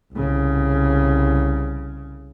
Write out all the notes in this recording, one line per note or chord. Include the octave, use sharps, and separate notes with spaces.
C2 C#3